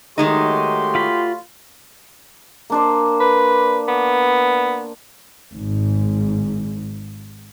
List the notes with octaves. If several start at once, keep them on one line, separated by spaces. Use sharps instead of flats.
D#3 G#3 A3 D#4 F#4 G4 C#5 C6
F4 B5
A#3 D4 C5
B4
B3
G#1 G#2